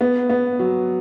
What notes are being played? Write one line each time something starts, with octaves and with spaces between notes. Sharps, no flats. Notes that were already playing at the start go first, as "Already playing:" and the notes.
B3
B3
F#3